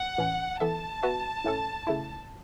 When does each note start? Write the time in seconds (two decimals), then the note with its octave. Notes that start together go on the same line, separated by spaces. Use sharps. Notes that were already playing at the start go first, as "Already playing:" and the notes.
Already playing: F#5
0.18 A2 E3 C#4
0.60 E3 B3 A4 E5 A5
1.03 B3 F#4 B4 E5
1.44 A2 A3 C#4 A4
1.87 C#3 A3 E4